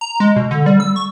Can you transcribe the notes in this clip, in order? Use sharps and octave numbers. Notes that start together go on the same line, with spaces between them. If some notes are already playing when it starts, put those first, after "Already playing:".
A#5
G#3
B2
D3
G3
E6
C#6